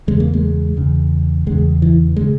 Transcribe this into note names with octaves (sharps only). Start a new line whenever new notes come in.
E2 C#3 G#3
A#3
G#3
E2 C#3
E2 C#3 G#3
E3
C#3 G#3